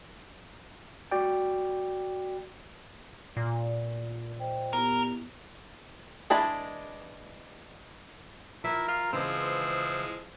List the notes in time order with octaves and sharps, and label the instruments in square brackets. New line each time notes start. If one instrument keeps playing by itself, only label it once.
[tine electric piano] F#4 D5 G5
[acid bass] A#2
[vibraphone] C5 D#5 G5
[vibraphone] B3 E4 G4 [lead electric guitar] A#4
[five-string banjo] E3 G#3 D4 A5 B5
[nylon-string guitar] F3 [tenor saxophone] E4 [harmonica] A#4
[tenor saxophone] F4
[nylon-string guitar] C#3 E3 [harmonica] F3 G#3 E6 [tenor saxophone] C4